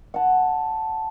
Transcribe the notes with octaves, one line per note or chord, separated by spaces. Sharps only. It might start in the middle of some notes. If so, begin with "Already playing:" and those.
F#5 A5